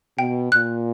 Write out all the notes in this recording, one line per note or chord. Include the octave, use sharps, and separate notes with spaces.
B2 G5
A#2 F#6